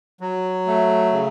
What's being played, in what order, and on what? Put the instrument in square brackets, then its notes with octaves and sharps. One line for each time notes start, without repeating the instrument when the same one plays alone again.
[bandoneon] F#3
A3
C#3